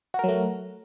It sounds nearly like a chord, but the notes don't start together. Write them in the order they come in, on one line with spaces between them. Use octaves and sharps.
F#4 A#4 F#3 A3